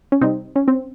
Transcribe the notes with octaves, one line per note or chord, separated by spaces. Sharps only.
C#4
C3 G3 C4 D#4
C#4
C4